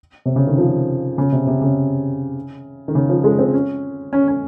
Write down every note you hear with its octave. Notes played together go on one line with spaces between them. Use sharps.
C3
C#3
D#3
F3
C#3
C3
C3
C#3
D#3
C#3
F3
G#3
C4
C#4
C#4
C#4